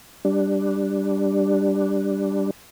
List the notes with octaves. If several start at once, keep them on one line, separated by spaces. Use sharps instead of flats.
G3 D4